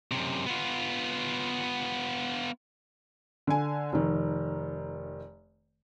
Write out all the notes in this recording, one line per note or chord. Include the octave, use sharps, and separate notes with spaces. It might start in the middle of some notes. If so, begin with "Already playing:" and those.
F#2 C3
B3 F4
D3 G#5
F1 D#3